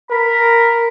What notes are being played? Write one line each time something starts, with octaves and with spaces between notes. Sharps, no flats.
A#4 B5